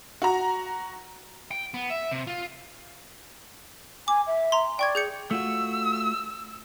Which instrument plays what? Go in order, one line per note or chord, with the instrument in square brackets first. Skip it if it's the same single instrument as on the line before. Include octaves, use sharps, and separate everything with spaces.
[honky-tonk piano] F#4 A#5
[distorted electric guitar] G5
B3
E5
C3
F4
[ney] G#5 [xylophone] D6
[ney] E5
[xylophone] A#5 C6
[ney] D5 [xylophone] G5 C#6 G#6
[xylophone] G#4 G6 C#7
[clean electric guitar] A3 F4 F#4 [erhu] E6